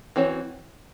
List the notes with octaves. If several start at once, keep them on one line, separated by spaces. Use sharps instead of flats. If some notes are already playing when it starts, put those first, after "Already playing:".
E3 C4 F#4 C#5